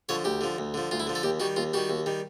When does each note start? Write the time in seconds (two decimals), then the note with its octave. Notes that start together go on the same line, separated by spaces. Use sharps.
0.09 D3 F3 C#5
0.24 D2 G4
0.41 D3 F3
0.58 D2
0.74 D3 F3
0.91 D2 F4
1.00 E4
1.07 D3 F3
1.15 A4
1.23 D#2 G4
1.40 D#3 G3 F#4
1.56 D#2 F4
1.73 D#3 G3 F#4
1.90 D#2
2.06 D#3 G3